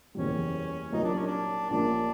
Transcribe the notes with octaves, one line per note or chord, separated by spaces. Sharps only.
F#1 E2 B2 G3 C#4
C2 A#2 F#3 A#3 D#4
D4
C#4
D4
A#1 A#2 G3 A#3 C#4 D4